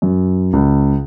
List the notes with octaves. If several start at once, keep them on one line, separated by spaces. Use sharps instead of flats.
F#2
C#2